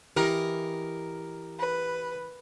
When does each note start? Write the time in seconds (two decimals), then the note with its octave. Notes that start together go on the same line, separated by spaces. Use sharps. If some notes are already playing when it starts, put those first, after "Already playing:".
0.16 E3 G4 A#4 D#5 F#5
1.59 B4